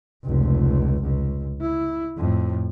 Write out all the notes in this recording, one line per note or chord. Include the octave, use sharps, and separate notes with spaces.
F1 C#2
C#2
E4
F2 A2